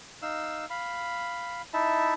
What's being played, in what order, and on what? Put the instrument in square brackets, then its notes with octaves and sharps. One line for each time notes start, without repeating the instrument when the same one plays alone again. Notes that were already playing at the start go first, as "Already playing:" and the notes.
[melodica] D#4 F5 E6
F5 B5
D#4 E4 E5 A5